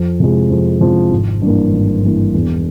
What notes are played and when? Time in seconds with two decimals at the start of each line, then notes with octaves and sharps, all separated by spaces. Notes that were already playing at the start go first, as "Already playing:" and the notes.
Already playing: F2
0.20 C3 F3 G#3
0.50 F2
0.81 C3 F3 G#3
1.11 G#1
1.42 G2 E3 A#3
1.73 G#1
2.03 G2 E3 A#3
2.34 E1